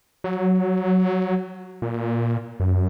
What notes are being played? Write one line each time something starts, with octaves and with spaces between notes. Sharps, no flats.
F#3
A#2
F#2